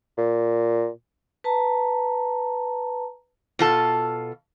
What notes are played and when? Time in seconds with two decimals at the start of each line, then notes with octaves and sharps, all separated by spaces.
0.18 A#2
1.44 B4 A5 A#5
3.59 B2 F4 A4